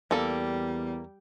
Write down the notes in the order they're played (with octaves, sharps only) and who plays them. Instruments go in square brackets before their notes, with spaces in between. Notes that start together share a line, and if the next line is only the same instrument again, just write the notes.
[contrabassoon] E2 [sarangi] G3 [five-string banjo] A#3 A4